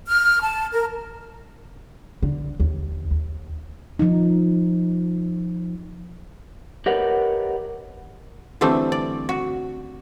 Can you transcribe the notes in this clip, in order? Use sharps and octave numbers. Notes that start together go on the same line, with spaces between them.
F6
A5
A#4
D3
D#2
D#2
F3 D#4
G4 A#4 B4 C#5 D#5 F#5
D3 E3 G3 A3 C4
D5
F#4